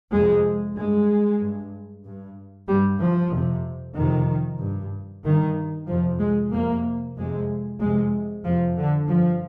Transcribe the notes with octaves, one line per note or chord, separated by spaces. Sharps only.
F2 C3 G#3
G2 G#3
G2
G2
G2 G3
F3
F2 C3
F2 C3 D#3
G2
G2 D#3
F2 C3 F3
G#3
F2 C3 A#3
F2 C3 G#3
F2 C3 G#3
F2 C3 F3
D3
G2 F3